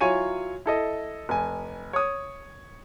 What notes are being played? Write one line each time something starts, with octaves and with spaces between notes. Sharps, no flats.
F#3 E4 F4 C#5 G#5 D#7
E4 A4 D#5
F1 G#5
C#5 D#6